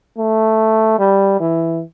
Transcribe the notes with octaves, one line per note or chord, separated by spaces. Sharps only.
A3
G3
E3